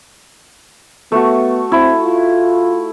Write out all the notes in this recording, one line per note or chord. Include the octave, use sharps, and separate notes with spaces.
A3 B3 F#4
C4 E4
F4